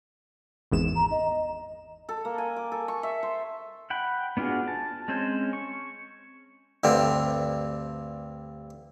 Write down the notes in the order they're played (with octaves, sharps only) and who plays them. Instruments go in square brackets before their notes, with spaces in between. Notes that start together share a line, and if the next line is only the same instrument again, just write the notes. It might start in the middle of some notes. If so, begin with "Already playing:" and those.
[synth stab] G#1 E2 E7
[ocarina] A#5
D#5
[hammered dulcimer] A4
A#3
G#5
D6
A4
C#6
E5
C5
[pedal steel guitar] F#5 G5 B5
B3 D4 F4 F#4 G#4
A5
G#3 C4 C#4 C5 C#5
C#6
[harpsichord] D2 G2 D3 C4